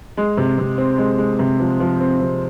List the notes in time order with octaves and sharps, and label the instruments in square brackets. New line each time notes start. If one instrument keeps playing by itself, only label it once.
[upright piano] G#3
C3
C3
C4
G#3
G#3
C3
F3
F3
C4
C3